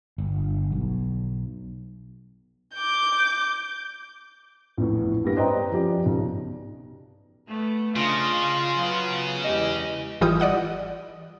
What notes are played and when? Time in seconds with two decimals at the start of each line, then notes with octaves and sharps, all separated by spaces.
0.18 G1
0.72 B1
2.75 D6 G6
4.77 A#1 E2 A2
5.24 G2 A#3 B3 G4 A#6
5.36 B4 C5 D5 D#5 G5 A#5
5.72 F3 C#4 G4 D5
6.06 B1
7.47 A3 B3
7.96 C#3 D4 F4 D#5
8.74 F#3 B3
9.44 E2 G#3 G4 D#5
10.21 G#1 E3 G3 F4 D#6 G6
10.40 D5 D#5 F#5 D#6